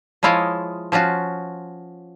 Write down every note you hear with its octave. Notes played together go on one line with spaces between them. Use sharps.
F3 G#3 E4 F4 C#5 D#5
F3 C#4 F4 F#4